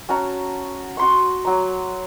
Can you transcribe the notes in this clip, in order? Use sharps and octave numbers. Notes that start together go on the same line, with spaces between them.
C#4 F#4 A5 A#5
F#4 C6 C#6
F#3 A#5